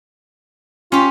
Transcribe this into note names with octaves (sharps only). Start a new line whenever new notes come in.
C#4 F4 G4